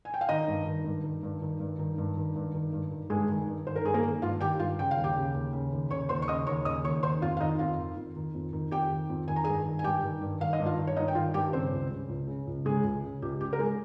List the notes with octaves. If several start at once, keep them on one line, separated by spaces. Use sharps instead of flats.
G#5
G5
F5
D#3 D#4 D#5
G2
D#3
G2
D#3
G2
D#3
G2
D#3
G2
D#3
G2
D#3
G2
D#3
G2 G#3 G#4
D#3
G2
D#3 C5
A#4
G2 G#4
A#3 A#4
D#3
G2 F4 F5
D#3 G4 G5
G2 F4 F5
C#3 G5
F5
D#2
G4 G5
C#3
D#2
C#3
D#2
C#3 C#5 C#6
D#2 C5 C6
C#6
C#3 D#5 D#6
D#2 C#5 C#6
C#3 D#5 D#6
D#2 C#5 C#6
D#3 C5 C6
F2 F4 F5
F5
D#3 D#4 D#5
F2 F4 F5
D#3
F2
D#3
F2
D#3
F2 G4 G5
D#3
F2
D#3 G#5
A#5
G2 G#4 G#5
D#3
G#5
G2 G4 G5
D#3
G2
D#3 F5
D#5
G2
F4 F5
D#3
C#5
G2 D#4 D#5
G5
D#3 F4 F5
G2 G4 G5
C#3 C4 C5
C#2
C#3
C#2
C#3
C#2
C#3 G#3 G#4
C#2
C#3
C#2 G4
C#3 G4
A#4
G#3 G#4